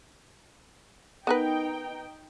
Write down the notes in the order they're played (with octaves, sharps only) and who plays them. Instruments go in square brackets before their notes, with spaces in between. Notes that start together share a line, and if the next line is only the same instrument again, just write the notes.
[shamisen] B3 A#4 B4 [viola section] D#4 G5